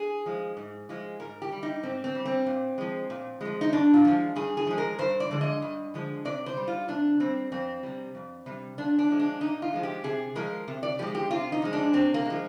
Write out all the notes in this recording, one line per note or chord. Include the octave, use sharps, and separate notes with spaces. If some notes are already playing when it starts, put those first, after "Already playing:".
Already playing: G#4
F3 G#3
G#2
F3 G#3
G#2 A#4
G4
G3
D#4
G#2 C4
C4
G3
C4
A#2
F3 G#3
A#2
F3 G#3
D#4
G2 D4
F4
F3 G#3
G2 G#4
G#4
F3 G#3
A#4
G2 C5
D5
D3 F3 G#3
D#5
G2
D3 F3 G#3
C3 D5
C5
G3
F4
C3 D4
G3 C4
F2 C4
C3 G3
F2
C3 G3
A#2 D4
D4
F3 G#3
D4
A#2 D#4
F4
F3 G#3
G4
C3 G#4
F3 G#3 A#4
C3
D5
F3 G#3 G4
G4
C3 F4
D#4
F3 G#3
D4
C3 C4
A#3
F3 G#3